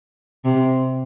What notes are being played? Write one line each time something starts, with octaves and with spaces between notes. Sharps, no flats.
C3